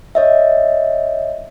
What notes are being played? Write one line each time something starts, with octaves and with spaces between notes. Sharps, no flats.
C#5 D#5 E5